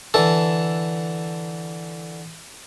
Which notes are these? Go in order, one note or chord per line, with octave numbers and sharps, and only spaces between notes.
D3 E3 A4